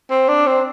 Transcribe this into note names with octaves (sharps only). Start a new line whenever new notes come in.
C4
D4
C4